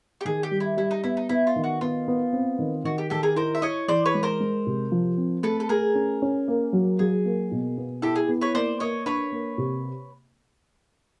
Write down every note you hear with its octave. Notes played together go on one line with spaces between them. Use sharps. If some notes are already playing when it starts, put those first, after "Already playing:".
G4
D#3 G#4
G4
G3
E4
G3 E4
D#4
B3 E4
D#4
B3 E4
F4
D#3
F#4
B3 F4
B3
C4
D#3
D#3 F#4
G4
D#3 G4 A4
G#4 A#4
E4 A#4 C5
E5
E4 C#5 D#5
E3 C5 D5
B4 C#5
G#3
A#4 C5
G#3
C3
F3
C4
A3 A4 B4
A4
A3 G#4 A#4
C#4
C#4
A#3
F#3
F#3 G#4
A#3
B2
B3
E4 G4 A4
G#4
B3
B4 C#5
A#3 C5 D5
A#3 C#5 D#5
D4 B4 C#5
A#3
C3